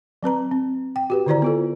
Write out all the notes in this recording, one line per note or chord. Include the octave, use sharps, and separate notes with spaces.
F#3 C4 B4 A#5
C4
G5
F#4 G4 B4
D3 D#3 E4 C5 D5 A#5
B3 F4 A4